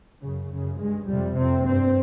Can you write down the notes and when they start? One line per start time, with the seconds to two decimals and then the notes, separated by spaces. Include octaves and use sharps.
0.20 F#2 C#3
0.49 F#2 C#3
0.78 G2 G#3
1.07 F2 G3
1.12 C3
1.36 F2 C3 C4
1.64 G2 C4